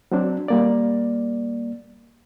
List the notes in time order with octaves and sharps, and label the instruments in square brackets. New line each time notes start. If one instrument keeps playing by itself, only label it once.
[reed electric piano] F#3 C4 D4
G3 A#3 D5